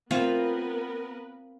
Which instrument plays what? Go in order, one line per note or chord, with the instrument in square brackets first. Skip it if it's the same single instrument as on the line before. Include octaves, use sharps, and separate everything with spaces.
[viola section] B3 A#4 B4 [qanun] C4 [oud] F4